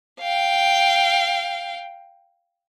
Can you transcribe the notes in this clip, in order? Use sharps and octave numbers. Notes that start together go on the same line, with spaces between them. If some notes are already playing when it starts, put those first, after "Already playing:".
F5 G5